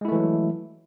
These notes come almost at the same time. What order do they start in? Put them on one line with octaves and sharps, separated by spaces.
G#3 E4 A3 E3 F#3